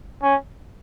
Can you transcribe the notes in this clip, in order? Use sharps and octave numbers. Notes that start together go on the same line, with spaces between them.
C#4